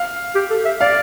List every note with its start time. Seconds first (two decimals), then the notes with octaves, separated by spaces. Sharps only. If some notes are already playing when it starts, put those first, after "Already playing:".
Already playing: F5
0.35 G4
0.50 A4
0.65 E5
0.81 D5 F5